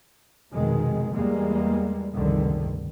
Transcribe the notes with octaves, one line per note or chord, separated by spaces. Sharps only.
F1 B2 D#3 G#3
E2 G3 G#3 A#3
F1 C#2 G2 D3 D#3